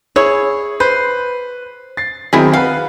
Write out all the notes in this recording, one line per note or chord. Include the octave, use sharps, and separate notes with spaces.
E4 G#4 C#5
B4 C5
A6 C7
D#3 F#3 C4 E4 G#4
B4 F5 F#5